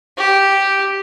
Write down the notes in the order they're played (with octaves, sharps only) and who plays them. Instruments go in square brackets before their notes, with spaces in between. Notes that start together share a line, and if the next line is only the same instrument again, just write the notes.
[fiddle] G4